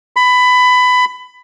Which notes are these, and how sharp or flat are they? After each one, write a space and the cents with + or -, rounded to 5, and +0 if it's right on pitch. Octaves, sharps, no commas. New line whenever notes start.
B5 +20